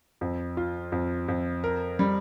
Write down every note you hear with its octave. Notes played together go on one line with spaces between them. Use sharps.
F2
F4
F2
F2
A#4
G3